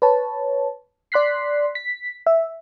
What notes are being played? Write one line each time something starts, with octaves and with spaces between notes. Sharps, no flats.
B4 C#5 A5
D5 C6 F#6 B6 C7
B6
E5